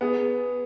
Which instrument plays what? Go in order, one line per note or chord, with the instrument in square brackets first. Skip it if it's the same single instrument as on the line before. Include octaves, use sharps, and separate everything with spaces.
[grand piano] B3 [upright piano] G#4